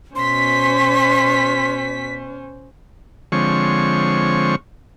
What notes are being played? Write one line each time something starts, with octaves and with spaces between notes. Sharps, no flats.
B2 C#4 C5 C6 B6
D3 F3 G#3 C4 C#5 C#6